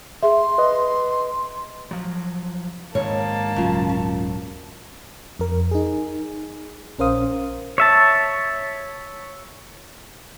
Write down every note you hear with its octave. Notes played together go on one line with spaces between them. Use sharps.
G#4 E5 C6
B4 D#5
F3 F#3
G#2 D#3 A#3 C#5 A5
D#1 C#3 F#3 F4
C#4
F2 A#4
D#4 G#4
A#1 C#4 A#4 C5 F5 D#6
C#5 E5 A5